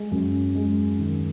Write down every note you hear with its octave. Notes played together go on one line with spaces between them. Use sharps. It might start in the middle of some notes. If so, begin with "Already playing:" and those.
Already playing: G#3
F#2
G#3
D#3